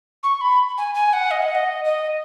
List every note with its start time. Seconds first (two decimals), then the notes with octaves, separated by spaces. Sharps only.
0.23 C#6
0.41 B5
0.78 G#5
0.94 G#5
1.13 F#5
1.31 D#5
1.42 F#5
1.55 D#5
1.84 D#5